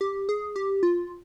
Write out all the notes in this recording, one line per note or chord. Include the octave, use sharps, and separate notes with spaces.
G4
G#4
G4
F4